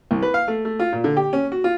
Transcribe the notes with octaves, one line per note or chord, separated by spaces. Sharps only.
C2
B4
F5
A3
A3
F4
A#2
D3
G4
C#4
F#4
F4